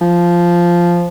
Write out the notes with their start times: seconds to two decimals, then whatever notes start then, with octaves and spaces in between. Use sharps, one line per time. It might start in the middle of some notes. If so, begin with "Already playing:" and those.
0.01 F3